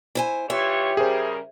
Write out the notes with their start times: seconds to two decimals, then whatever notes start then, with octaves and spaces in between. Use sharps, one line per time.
0.15 E4 C5 G#5
0.50 E3 F4 G4 C#5 E5
0.97 C#3 G3 G#4 A#4 C5